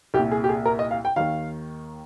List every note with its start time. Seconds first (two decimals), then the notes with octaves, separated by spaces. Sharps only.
0.14 C2 G4
0.19 A#2
0.32 G#4
0.44 G4
0.49 G#4
0.65 A#4
0.79 D#5
0.91 F5
1.05 G5
1.16 D#2 D#3 F5